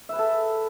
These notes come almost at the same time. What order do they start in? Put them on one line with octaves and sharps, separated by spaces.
E5 B4 G#4 A4